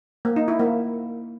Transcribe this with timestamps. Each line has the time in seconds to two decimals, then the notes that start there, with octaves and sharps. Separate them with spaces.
0.25 A#3
0.36 D#4
0.48 E4
0.59 A#3